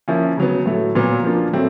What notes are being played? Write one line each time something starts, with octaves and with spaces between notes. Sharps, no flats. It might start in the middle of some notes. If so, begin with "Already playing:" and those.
F3 A#3 C#4 E4
C#3 F#3 B3
A2 F#3 A3
A#2 F#3 B3
F3 A#3 D4 F4
A2 F#3 A3 C4